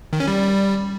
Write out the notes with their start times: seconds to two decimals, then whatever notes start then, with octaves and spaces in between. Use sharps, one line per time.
0.13 D#3
0.20 C#4
0.27 G3